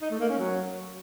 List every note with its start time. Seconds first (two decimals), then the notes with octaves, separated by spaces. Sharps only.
0.02 D#4
0.11 A3
0.20 A#3
0.29 C#4
0.39 F#3